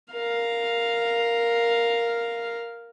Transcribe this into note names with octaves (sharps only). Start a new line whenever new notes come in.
A#4 F5